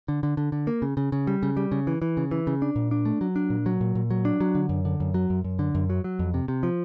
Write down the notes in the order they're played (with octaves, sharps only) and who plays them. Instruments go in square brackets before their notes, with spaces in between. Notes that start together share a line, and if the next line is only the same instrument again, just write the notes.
[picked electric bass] D3
D3
D3
D3
A#3
C#3
C#3
C#3
G3
C#3
G3
C#3
E3
E3
C#3
E3
C#3
D4
A#2
D4
A3
F#3
D4
A#2
F#3
A#2
A#2
F#3
D4
F#3
D3
F#2
D3
F#2
F#3
F#2
F#2
D3
F#2
F#3
F#3
F2
C3
C3
F3